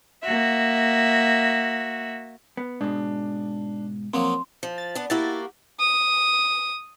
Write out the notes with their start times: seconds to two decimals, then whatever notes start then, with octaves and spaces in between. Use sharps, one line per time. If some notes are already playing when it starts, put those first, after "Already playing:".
0.22 A#3 F#4 E5
2.57 B3
2.81 G#2 B2 D4
4.14 F3 F#3 A#3 C4
4.63 F3
4.78 A6
4.95 B3 D4
5.10 A#3 E4 F#4 G4 A6
5.79 D#6